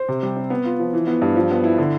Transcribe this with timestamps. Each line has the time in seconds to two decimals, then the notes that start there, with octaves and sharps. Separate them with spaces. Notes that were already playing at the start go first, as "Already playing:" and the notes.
Already playing: C5
0.09 C3
0.23 G3
0.37 C4
0.50 B3
0.65 F4
0.80 F3
0.93 E3
1.07 B3
1.22 G2
1.36 F3
1.50 B3
1.64 E4
1.78 D3